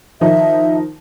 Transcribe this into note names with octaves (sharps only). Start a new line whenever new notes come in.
D#3 F3 D#4 E5